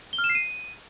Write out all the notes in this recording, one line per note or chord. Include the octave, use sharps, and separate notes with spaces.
G7
F6
E7
C7
D#7